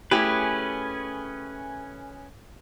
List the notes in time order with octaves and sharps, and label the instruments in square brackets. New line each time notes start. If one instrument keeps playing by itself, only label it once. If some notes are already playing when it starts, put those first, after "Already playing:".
[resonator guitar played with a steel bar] A3 E4 G4 [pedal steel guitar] C#4 G#4 B4